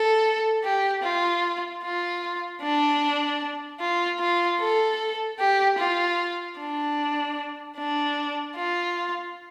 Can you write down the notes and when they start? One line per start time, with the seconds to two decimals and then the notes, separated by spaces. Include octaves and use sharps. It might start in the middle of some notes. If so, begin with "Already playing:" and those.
Already playing: A4
0.63 G4
1.03 F4
1.83 F4
2.61 D4
3.80 F4
4.20 F4
4.60 A4
5.39 G4
5.79 F4
6.58 D4
7.77 D4
8.56 F4